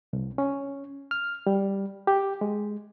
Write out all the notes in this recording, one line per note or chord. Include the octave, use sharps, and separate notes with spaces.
C2
C#4
F6
G3
G4
G#3